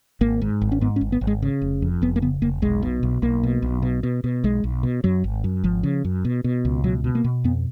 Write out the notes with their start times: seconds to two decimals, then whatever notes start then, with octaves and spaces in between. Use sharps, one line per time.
0.21 G#1 A#3
0.42 G#2
0.62 G#1
0.72 C#4
0.81 G#2 B3
0.96 C#4
1.01 G#1
1.12 B3
1.21 G#1
1.27 G#3
1.42 C#3
1.62 F1
1.82 F2
2.02 F1 B3
2.16 A#3
2.22 C#3 B3
2.42 F1 A#3
2.62 B1 G#3
2.83 B2
3.03 B1
3.22 B1 A#3
3.43 B2
3.62 B1
3.82 B2
4.03 B2
4.24 B2
4.44 B1 G#3
4.64 B1
4.83 B2
5.04 F#2 F#3
5.24 G#1
5.44 F#2
5.64 G#1 F3
5.83 C#3
6.05 F#2
6.25 B2
6.44 B2
6.65 C#2
6.84 B2 F#3
7.04 B2
7.15 A#3
7.24 B2
7.44 F2 B3